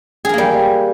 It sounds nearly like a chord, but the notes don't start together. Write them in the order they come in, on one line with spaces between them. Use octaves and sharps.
G#4 A#4 A#3 G3